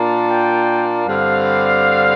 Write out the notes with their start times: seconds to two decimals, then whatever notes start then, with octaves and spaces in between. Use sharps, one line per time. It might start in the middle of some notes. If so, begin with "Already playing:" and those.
Already playing: A#2 A#3 D4
0.30 G5
1.06 G2 D3 G3 C4 F5